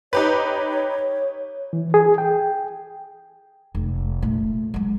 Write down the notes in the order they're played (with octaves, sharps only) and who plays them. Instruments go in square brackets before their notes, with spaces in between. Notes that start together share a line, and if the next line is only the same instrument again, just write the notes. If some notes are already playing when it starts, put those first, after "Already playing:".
[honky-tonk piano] D#4 G4 B4 [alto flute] C#5
[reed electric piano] E3
G#4
G5
[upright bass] F1
A#2 A3
F#3 G#3